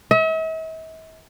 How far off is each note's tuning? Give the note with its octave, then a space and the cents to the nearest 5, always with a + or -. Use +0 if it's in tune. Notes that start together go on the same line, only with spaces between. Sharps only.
E5 -45